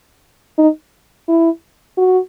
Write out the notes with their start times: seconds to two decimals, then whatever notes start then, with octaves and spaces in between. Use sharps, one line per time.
0.58 D#4
1.28 E4
1.97 F#4